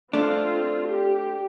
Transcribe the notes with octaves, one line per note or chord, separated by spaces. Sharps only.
A3 C4 D4 F4
G4